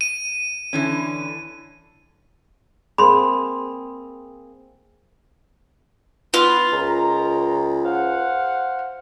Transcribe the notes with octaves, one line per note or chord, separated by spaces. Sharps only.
D#7
D3 E3 C#4
A#3 C4 G#4 B5 C6
B3 F4 B4 B5
C#2 A#4 D#5 A#5
C5 F5 F#5